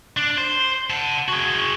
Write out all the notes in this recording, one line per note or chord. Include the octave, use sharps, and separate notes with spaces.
D4
C5
F#5 A5
F#4 G#4